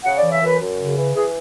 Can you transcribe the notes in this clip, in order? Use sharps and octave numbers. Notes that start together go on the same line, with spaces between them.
C#3 F#5
D5
E3
E5
F#2 B4
F#2
C#3
E3
E3 G#4